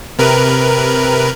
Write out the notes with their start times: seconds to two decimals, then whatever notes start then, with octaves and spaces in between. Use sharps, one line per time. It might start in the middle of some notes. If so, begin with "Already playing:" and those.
0.19 C3 A#4 B4